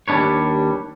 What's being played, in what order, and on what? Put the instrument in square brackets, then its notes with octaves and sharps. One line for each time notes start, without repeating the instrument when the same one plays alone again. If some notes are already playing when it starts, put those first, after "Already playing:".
[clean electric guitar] D#2 G3 D4 B4 C#5